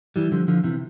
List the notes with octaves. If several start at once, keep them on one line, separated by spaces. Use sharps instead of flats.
E3 G3
D3 F3
D3 F3
C3 E3